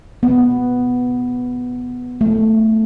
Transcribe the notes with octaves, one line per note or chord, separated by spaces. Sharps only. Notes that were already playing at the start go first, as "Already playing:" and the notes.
B3
A3